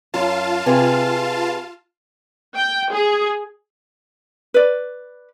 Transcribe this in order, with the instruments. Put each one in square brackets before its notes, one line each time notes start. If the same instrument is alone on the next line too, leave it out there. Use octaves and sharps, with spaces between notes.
[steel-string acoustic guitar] F#2 [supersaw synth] F4 F5 A5
[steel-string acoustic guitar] C3 G#4 B4
[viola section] G5
G#4
[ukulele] B4 D5